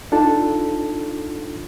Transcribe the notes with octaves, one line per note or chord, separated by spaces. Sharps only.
D4 D#4 F4 A4 A5